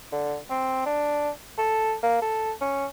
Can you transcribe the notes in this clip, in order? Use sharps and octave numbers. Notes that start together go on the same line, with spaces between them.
D3
C4
D4
A4
A#3
A4
C#4